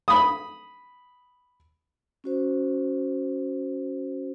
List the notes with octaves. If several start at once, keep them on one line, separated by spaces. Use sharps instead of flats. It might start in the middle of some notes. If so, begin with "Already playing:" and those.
B5 D#6
C#4 F#4 C5